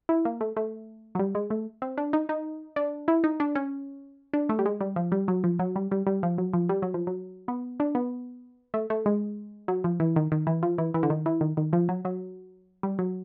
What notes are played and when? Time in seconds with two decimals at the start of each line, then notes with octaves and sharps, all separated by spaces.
0.09 E4
0.25 A#3
0.41 A3
0.57 A3
1.15 F#3
1.19 G3
1.35 G#3
1.50 A3
1.82 C4
1.98 D4
2.13 D#4
2.29 D#4
2.76 D4
3.08 E4
3.24 D#4
3.40 D4
3.55 C#4
4.33 D4
4.49 A3
4.59 G3
4.66 G#3
4.81 G3
4.96 F3
5.12 G3
5.28 F#3
5.44 F3
5.59 F#3
5.76 G3
5.91 G3
6.07 G3
6.23 F3
6.38 F#3
6.53 F3
6.69 G3
6.82 F#3
6.94 F3
7.07 F#3
7.48 B3
7.80 D4
7.95 B3
8.74 A3
8.90 A3
9.06 G#3
9.68 F#3
9.84 F3
10.00 E3
10.16 D#3
10.32 D#3
10.47 E3
10.63 F3
10.78 E3
10.94 E3
11.03 D3
11.10 D#3
11.26 E3
11.41 D#3
11.57 D#3
11.73 F3
11.89 F#3
12.05 F#3
12.83 G3
12.99 F#3